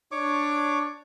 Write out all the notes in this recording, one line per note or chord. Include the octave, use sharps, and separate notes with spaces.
D4 C#5 C#6 D6